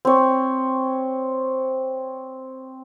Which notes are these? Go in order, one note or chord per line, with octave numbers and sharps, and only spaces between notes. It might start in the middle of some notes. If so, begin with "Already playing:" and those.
C4 C#5